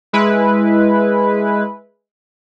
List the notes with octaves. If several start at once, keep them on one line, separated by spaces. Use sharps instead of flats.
G#3 E4 B4